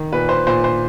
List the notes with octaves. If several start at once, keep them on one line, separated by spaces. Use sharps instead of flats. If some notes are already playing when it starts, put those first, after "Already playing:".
Already playing: D#3
A#2 B4
C5
A#2 C5
C5